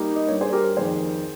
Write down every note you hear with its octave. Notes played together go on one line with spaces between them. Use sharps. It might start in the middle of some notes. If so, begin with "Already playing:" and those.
Already playing: G3 A#3 D#4 G4
D#5
G2 G3 A#3 C#5
G#4 C5
G4 A#4
F2 D#3 A#3 G#4 C5